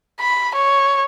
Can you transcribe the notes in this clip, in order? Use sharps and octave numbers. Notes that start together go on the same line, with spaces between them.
B5
C#5